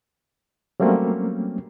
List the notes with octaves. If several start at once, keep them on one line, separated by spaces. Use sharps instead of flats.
F#3 G3 A3 A#3 C4 C#4